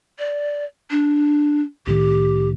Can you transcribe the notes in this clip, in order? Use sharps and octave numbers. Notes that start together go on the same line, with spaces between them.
D5
D4
C2 A2 D#3 G4